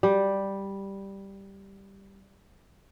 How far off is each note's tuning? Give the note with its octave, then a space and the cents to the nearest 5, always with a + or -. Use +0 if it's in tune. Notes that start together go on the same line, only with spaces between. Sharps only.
G3 +0 D5 +5